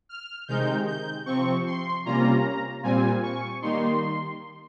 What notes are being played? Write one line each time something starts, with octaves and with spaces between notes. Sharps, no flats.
F6
C3 D#3 G#3 D#4 G6
G6
C3 F3 C4 C#6
C6
C3 G3 A#3 C#4 F4 A#5
A#2 G3 C4 F4 G#5
C#6
D#3 G3 A#3 D#4 C6